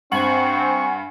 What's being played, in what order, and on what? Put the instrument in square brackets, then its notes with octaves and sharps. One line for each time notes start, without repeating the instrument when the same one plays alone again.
[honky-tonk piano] G2 [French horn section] C4 [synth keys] F#5 G#5 [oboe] C#6